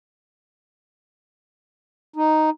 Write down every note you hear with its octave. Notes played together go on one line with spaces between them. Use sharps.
D#4